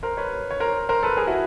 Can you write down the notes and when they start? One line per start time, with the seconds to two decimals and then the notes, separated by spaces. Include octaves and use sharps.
0.03 A#4 C5
0.17 B4 C#5
0.51 C#5
0.60 A#4 C5
0.89 A#4 C5
1.03 A4 B4
1.17 G#4 A#4
1.27 E4 F#4